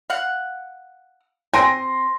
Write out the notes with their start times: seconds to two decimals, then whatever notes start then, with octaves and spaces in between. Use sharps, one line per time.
0.10 F5 F#5
1.54 C4 G5 G#5 C6 A#6